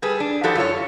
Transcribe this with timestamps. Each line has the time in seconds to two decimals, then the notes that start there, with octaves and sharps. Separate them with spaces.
0.02 G3 G#4 A4 B4
0.20 D4
0.44 F3 E4 F#4 G4 A4
0.55 F#2 F4 A4 C#5